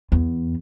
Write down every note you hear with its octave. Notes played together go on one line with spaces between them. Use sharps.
E2